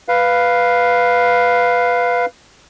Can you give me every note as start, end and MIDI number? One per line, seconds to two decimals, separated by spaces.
0.08 2.26 71
0.08 2.26 77